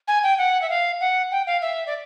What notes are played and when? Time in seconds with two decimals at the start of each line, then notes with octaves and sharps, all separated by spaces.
0.08 G#5
0.23 G5
0.38 F#5
0.62 E5
0.70 F5
1.01 F#5
1.32 G5
1.47 F5
1.62 E5
1.87 D5